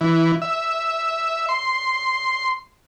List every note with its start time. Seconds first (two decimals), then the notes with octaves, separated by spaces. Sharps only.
0.01 E3
0.42 E5
1.49 C6